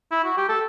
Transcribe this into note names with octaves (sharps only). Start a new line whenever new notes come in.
E4
F#4
G4
A4